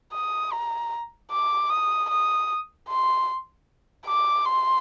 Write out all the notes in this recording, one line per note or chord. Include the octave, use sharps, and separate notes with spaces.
D#6
A#5
D6
D#6
D#6
C6
D6
C6